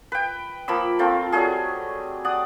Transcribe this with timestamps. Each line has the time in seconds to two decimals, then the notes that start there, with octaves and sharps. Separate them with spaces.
0.12 B4 G5
0.68 F3 A#3 B5 E6
0.99 A3 C4 F4 A#4
1.32 F#3 G3 A3 G#4
2.25 D5 F#5 D#6